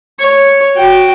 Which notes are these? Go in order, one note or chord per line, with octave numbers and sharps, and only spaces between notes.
C#5
F#4 G5